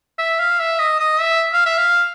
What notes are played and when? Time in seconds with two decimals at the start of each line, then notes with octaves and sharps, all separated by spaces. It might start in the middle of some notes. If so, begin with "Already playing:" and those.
0.18 E5
0.40 F5
0.60 E5
0.79 D#5
1.00 D#5
1.20 E5
1.53 F5
1.66 E5
1.78 F5